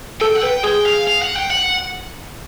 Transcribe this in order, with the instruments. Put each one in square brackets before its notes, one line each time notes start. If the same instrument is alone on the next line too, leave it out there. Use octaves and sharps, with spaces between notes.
[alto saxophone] A4 [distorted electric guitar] G5
[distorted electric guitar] F#5
[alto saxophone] B4 [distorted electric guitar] G5
[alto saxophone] G#4 [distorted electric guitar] G5
[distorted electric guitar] F5
F5
F#5
G5
F#5